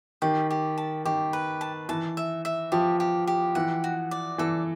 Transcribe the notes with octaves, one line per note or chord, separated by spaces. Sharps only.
D#3 G4
G4
A5
D#3 G4
B4
A5
E3 A5
E5
E5
F3 G4
G4
G4
E3 F#5
F#4
D5
E3 A4